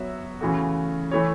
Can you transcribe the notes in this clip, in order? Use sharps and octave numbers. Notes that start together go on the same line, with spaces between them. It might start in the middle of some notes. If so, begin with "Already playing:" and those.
Already playing: F#3 B3 F#4 C#5 E5
C#3 E3 A3 F#4
E3 A3 E4 C#5